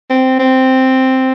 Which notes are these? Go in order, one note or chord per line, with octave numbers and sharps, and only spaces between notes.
C4
C4